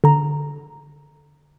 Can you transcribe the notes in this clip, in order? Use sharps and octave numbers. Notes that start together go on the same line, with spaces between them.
D3 A#5